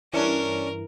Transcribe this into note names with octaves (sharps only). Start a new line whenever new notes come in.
G2 E3 C#4 D4 A#4